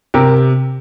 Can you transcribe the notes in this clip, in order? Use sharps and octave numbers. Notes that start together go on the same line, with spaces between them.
C3 G4 A#4